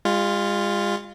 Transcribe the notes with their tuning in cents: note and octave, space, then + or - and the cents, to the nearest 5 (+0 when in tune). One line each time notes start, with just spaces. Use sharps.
G#3 -45 F4 +0